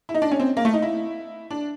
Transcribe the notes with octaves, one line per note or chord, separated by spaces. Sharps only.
E4
D#4
D4
C#4
C4
A#3
A3
D#4
E4
D4